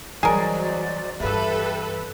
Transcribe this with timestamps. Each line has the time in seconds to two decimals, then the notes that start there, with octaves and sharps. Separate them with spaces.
0.23 E3 F#3 G3 G#4 A#4 C5 D5 D#5
1.20 G2 E3 G4 A4 B4 E5 F5